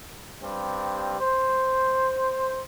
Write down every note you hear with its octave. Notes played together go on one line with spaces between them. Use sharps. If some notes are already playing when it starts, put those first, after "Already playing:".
G2 G3 C4
C5